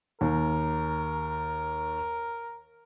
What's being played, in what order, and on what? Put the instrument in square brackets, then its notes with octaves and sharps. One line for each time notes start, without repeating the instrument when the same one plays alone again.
[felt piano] D#2 [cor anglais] A#4